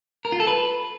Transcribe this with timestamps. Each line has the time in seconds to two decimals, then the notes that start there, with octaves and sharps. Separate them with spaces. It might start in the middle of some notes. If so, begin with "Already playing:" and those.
0.25 A#4
0.32 F4
0.40 A4
0.47 B4